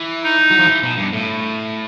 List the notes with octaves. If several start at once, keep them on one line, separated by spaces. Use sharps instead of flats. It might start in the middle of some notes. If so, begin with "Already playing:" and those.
Already playing: E3
D#4
F#3
F3
E3
B2
G2
A2